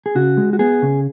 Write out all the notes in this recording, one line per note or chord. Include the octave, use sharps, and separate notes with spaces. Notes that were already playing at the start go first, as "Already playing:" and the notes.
G#4
C#3 F#4
G#3
F#4
B3 G#4
C#3